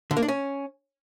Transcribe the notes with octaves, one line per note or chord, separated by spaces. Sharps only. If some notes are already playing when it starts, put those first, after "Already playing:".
D3
A#3
D4
C#4